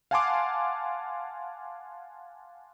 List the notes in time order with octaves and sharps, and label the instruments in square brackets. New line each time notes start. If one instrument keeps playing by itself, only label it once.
[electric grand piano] F5 F#5 G#5 A5 C6 D6